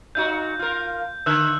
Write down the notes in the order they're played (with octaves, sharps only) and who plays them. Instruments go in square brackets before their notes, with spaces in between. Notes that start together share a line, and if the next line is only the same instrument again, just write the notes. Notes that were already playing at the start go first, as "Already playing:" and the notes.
[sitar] A#2 D#4 F#4 [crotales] G6
[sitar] F4 A#4
[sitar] D3 [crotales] E6 F#6